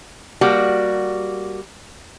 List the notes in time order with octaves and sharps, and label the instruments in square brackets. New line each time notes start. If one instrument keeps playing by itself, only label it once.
[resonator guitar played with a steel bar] G3 A#3 F#4